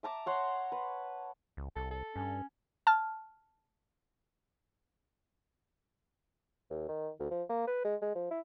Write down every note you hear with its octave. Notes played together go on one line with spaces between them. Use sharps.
E5 A5 A#5 D6
C#5 F#5 C6
B4
C#2
C2 A4
A4
G2 C#4
A5 F6
D#2
D#3
D2
F3
A#3
B4
G#3
G#3
F3
E4